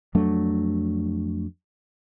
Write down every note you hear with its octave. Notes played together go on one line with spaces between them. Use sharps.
F2 F#3 A3 D4